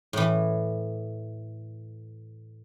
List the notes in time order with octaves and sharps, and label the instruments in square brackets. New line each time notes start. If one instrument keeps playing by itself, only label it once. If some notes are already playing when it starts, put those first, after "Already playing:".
[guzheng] A2 E3